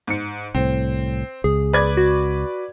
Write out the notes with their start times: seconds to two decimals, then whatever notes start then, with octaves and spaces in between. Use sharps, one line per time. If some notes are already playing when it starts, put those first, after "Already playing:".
0.08 G#2 C#7
0.55 C2 A2 C4
1.44 C#2 G#4
1.73 B4 D5 G#6
1.97 F#4